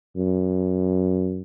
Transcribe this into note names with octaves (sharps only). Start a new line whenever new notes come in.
F#2